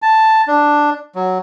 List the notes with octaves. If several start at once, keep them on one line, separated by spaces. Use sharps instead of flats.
A5
D4
F#3